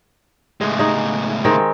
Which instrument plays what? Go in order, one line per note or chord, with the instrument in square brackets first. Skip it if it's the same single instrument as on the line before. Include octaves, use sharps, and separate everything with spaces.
[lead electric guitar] C#2 A2 [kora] G#3
[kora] G#3 D#4 G#4
D#3 G#3 C4